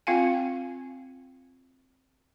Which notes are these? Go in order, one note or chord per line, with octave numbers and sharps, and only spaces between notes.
C4 F4 F5 G#5